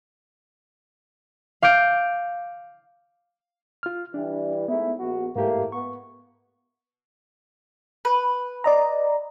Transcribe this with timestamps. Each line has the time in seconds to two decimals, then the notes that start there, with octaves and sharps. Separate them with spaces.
1.62 F5 D6 G6 D7
3.83 F4 F6
4.14 E3 G3 D4
4.68 G#2 A3 B3 E4
5.00 A#1 F#4
5.36 G#2 E3 A3 A#3 G4
5.72 B3 C#6
8.05 B4
8.64 D5 D#5 A#5